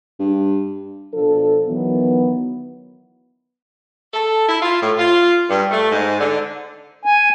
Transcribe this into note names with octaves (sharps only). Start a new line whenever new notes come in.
G2
B2 F3 D4 A4
D#3 E3 F#3 B3
A4
E4
F4
A2
F4
G2
A3
G#2
D3
G#5